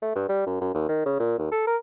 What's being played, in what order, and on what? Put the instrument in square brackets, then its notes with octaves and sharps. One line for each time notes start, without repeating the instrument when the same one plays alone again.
[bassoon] A3
G2
G3
F#2
F#2
D#2
D#3
C#3
A#2
D#2
A4
A#4